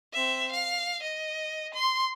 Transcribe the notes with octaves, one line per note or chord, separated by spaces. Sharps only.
C4 E5
F5
D#5
C6